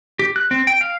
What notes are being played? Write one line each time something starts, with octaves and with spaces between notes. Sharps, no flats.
G4
F#6
C4
G5
F5